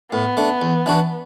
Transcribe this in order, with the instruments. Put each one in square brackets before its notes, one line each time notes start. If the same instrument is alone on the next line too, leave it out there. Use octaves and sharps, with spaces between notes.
[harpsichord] A2 [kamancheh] B3
[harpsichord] A3 D4
E2
E3 D4 F#4